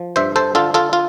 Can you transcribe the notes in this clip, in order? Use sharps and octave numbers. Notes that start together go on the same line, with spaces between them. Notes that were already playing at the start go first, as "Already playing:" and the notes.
Already playing: F3
G2 C5 E5
A4 C5
D3 F4 A4
F4 A4
F4